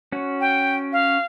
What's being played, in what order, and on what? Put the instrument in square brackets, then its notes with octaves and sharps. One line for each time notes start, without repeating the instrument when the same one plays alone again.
[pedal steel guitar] C#4 F#4
[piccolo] G5
F5